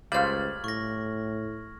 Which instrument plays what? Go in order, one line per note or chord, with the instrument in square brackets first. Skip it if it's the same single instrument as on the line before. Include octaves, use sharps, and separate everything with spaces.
[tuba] C#2 [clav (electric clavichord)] G3 A3 [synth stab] C5 F5 [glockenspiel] F6 G#6 F#7
[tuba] A2 [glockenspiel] C#6 A#6